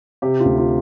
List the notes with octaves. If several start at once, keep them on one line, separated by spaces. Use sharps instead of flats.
C3 G4
F4
D2
F4